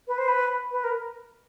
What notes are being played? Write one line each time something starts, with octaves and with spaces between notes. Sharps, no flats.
B4
C5
B4
B4
A#4